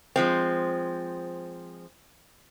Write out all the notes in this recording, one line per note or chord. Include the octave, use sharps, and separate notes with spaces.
F3 G#3 C4